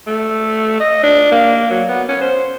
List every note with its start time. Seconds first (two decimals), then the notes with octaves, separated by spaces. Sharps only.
0.07 A3
0.80 D#5
1.03 D4
1.32 A#3
1.71 F#3
1.89 B3
2.09 C#4
2.22 C5